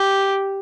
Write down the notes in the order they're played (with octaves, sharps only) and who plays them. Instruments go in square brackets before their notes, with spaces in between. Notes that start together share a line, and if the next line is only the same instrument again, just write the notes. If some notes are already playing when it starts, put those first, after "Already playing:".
Already playing: [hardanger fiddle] G4